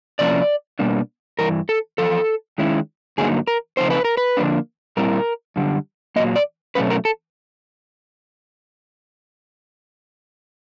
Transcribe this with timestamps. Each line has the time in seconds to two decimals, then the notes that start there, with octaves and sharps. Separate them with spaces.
0.19 C3 F3 A#3 C#4 E4 D5
0.79 B2 G3 A#3 D4
1.39 G2 E3 A#4
1.69 A4
1.98 E2 C#3 F3 A4
2.58 D#3 G#3 C#4 E4
3.18 G2 D3 F#3 A#3 D#4 G#4
3.47 A#4
3.77 C#3 F3 A3 C4 D#4 C5
3.90 B4
4.05 A#4
4.17 B4
4.37 D3 F3 A#3 D4
4.97 A#2 G3 C4 E4 A#4
5.56 F#2 D3 G3
6.16 A#2 F#3 A#3 D#5
6.36 D5
6.75 B2 F#3 A3 C#4 B4
6.90 A#4
7.05 A4